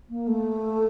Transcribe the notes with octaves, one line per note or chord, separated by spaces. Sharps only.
A#3
A3